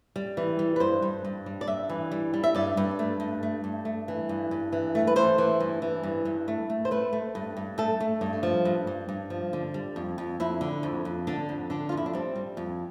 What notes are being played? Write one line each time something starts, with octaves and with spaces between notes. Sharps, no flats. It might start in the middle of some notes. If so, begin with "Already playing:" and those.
G3
E3
G3
B4
G2 C5
G2
G2
G3
D5
G2 E5
E3
G3
G3
E5
G2 D5
G2
A3
G2
A3
G2
A3
E3
G2
G2
E3
A3
B4
E3 C5
E3
G2
E3
G2
G2
A3
A3
C5
A3 B4
A3
G2
G2
A3 A4
A3
G2
F3
G2
G2
G2
F3
D3
G3
F2
F2
F2 E4
D3
F2
F2
D3 D4
F2
D3 D4
F4
F2
E4
D4
G3 C4
G3
F2